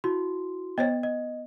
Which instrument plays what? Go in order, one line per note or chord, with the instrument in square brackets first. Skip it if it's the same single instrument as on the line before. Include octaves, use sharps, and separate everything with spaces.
[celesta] E4 F#4 C6
[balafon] B3 C5 C#5 [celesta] D#5
[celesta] D#5